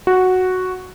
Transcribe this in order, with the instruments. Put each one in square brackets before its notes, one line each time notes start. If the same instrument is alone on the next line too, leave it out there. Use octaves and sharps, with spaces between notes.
[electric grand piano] F#4